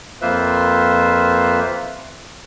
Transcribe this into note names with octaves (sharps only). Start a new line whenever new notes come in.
F2 A#3 F4 B4 C5 E5